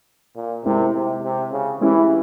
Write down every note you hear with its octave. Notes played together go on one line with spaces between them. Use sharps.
A#2
C3 G#3 E4 A#4
C3
C3
C#3
E3 G#3 C#4 E4 G4